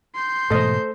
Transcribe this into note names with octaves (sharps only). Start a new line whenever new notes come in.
C6 G6
G#2 B2 E3 A3 A4 C5 D#5